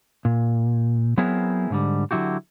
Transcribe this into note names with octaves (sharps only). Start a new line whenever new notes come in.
A#2
F#3 B3 C4 E4 G#4 A#4
G#2 D3 G3
D3 F#3 E4 F#4 G4